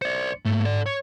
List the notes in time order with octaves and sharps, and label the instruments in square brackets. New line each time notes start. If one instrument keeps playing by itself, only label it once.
[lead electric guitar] C5 D5 [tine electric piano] C#7
[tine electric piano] G#2 [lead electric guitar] A3 A#3
[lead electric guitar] A4 D5
C#5